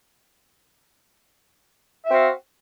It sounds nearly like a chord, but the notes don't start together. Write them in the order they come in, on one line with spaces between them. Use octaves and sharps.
E5 C4 F#4 F5